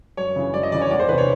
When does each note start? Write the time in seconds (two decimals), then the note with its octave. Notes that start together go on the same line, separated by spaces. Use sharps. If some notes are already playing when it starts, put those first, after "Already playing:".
0.17 F#2 C#5
0.36 C#3 E3
0.54 F#2 D5
0.63 D#5
0.72 C#3 E3 D5
0.81 C#5
0.91 E2 D5
1.00 C5
1.09 C3 E3 B4
1.18 C#5